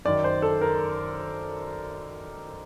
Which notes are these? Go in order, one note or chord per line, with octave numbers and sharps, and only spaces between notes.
F#2 D#3 D5
C5
A4
A#4